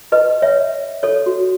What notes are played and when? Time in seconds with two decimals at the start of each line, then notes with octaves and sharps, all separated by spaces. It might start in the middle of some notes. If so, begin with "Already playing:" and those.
0.12 B4 D#5
0.42 C#5 E5
1.03 A4 C#5
1.26 F#4